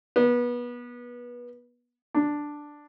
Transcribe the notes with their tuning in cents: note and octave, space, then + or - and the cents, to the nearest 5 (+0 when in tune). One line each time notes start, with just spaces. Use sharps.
B3 -25
D4 +5